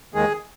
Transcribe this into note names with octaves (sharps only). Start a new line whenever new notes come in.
D#2 D#3 G#3 G#4